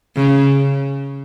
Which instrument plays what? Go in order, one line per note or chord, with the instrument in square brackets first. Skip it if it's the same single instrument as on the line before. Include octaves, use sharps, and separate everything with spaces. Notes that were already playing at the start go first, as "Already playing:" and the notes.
[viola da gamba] C#3